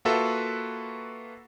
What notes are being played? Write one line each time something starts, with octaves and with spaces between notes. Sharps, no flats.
A#3 F4 F#4 A4 B4 E5